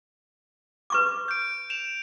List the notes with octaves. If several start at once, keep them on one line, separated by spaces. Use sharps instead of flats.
B4 C#6 D6
G6 D7
E7 F7